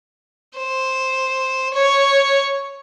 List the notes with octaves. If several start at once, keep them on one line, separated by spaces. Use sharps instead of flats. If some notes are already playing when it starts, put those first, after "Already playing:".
C5
C#5